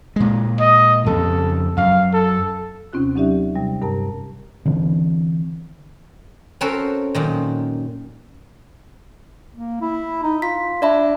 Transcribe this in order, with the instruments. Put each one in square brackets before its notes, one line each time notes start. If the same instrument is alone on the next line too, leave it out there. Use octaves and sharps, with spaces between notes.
[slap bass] A#2 G#3
[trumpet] D#5
[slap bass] F2 C#3 [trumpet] A4
[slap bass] F#2 [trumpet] F5
[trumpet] A4
[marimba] D#2 C3 C4 C#4 F4 F#6
F#3 C#4 D#4 G4 D5 E5
C3 G3
G2 C3 A#4 A5 A#5
[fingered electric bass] D3 E3 C4
[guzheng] C4 C#4 F#4 A4 A#4 C5
F#2 A#2 D#3
[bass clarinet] A#3
E4
D#4
[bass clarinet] F4 [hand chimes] B6
[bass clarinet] D4 [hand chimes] D5 E5 B5